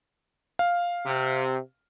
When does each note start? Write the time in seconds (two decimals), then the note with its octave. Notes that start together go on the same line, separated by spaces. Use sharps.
0.59 F5
1.06 C3